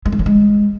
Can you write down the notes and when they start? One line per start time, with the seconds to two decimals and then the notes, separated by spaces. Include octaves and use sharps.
0.06 G#3
0.12 A3
0.19 F#3
0.26 G#3